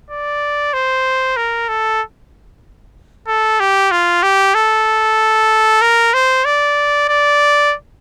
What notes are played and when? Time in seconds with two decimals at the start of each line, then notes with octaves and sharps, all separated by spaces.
0.10 D5
0.73 C5
1.37 A#4
1.69 A4
3.27 A4
3.60 G4
3.91 F4
4.23 G4
4.54 A4
5.81 A#4
6.14 C5
6.45 D5
7.08 D5